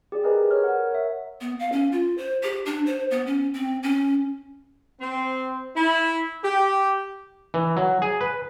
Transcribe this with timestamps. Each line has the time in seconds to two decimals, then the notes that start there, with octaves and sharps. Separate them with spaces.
0.12 G4 G#4 D5
0.24 G#4 A#4 B4 D#5 G#5 A#5
0.51 C#5 F6
0.64 A#4 F#5
0.91 C#5 E5
1.41 B3
1.60 F5
1.72 C#4
1.92 F4
2.18 C5
2.43 G4
2.66 D4
2.86 C5
3.11 B3
3.26 C#4
3.54 C4
3.83 C#4
5.01 C4
5.76 E4
6.44 G4
7.54 E3
7.77 F#3
8.02 G#4
8.21 B4